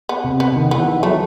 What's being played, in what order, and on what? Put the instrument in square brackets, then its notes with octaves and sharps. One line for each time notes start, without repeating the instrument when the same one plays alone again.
[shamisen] B3
[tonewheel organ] C3
[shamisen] B3
[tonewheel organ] D#3
[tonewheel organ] E3 [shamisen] B3
[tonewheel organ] E3
[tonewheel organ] F#3 [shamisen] A3